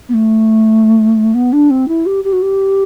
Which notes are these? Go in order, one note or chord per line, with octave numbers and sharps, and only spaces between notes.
B3
A3
B3
D4
C4
E4
G4
G4
F#4
G4